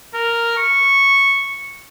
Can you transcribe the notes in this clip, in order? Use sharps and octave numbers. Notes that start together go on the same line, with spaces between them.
A#4
C#6